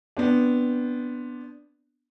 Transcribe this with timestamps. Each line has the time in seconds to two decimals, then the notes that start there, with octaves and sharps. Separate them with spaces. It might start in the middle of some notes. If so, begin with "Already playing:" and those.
0.17 B3 C4 D4